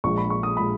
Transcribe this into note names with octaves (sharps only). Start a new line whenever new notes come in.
A#1 A#2 G#3 C#6
B5
C#6
D#6
A#2 G#3 B5